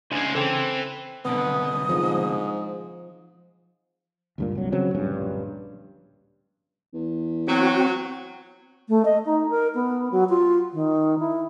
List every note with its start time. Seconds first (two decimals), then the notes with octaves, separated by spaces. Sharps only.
0.12 D2 C#3 G#3 D4 C5 G#5 G#6
0.35 C#3 E3 A4 C5 G5
1.25 C2 B2 D3 B3 D#6
1.89 G#2 F3
4.38 D2 G2 A#2
4.55 C2 F#3
4.72 C#3 F#3 C4
4.94 D1 A#1 G2 C#4
6.94 E2
7.48 F#3 C4 F#4
8.89 A3
9.05 D#5
9.26 D#4
9.50 A#4
9.75 B3
10.11 F#3
10.29 F4
10.73 D#3
11.19 E4